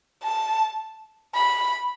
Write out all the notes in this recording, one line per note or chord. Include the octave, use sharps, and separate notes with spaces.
A5
B5